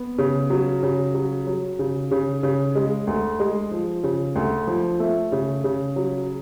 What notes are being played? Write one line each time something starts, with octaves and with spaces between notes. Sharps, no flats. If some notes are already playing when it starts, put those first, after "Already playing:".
Already playing: B3
C#3
F#3
C#3
F#3
F#3
C#3
C#3
C#3
G#3
D2
G#3
F3
C#3
D2
F3
A3
C#3
C#3
F#3